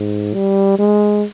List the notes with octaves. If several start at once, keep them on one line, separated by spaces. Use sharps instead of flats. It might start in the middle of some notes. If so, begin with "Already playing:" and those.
Already playing: G#2
G3
G#3